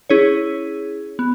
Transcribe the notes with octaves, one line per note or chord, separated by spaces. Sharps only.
C#4 E4 G#4 C#5
B3